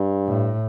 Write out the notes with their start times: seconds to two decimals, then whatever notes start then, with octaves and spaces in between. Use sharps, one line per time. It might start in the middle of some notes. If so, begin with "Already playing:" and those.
Already playing: G2
0.27 A2